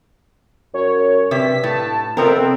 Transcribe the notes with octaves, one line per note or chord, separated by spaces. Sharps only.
F#2 C#5
G2 C3 B6
A2 A5
F2 C3 B3 C4 A#4